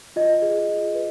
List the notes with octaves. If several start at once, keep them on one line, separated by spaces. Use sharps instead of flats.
F4 D#5
G#4
F4
B4